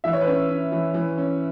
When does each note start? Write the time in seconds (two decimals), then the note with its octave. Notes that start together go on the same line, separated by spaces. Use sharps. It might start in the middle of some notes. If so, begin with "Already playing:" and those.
0.04 E3 E5
0.13 C#5
0.21 B4
0.27 C#4 C#5
0.50 C#4
0.72 E3
0.94 E3
1.18 C#4